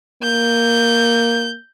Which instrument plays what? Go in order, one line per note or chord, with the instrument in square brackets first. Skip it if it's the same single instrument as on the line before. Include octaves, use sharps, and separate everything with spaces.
[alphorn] A#3 [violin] G6